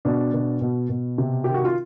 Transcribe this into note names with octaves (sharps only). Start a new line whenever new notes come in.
B2 D4
B2
B2
B2
C3
D#3 G4
F#4
F4